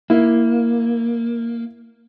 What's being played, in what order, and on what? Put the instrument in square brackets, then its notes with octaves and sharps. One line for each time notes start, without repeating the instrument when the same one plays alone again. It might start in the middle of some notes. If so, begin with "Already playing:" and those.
[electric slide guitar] A#3 [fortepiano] E4